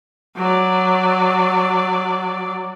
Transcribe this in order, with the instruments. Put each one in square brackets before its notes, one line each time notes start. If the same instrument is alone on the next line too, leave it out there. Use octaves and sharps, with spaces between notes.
[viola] F#3 D5